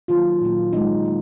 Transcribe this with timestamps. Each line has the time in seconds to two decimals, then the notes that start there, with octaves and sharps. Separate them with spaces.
0.08 D#3 F#3 A#3 F4
0.41 A#2 F#3 A#3
0.73 D#3 G#3 D#4
1.05 A#3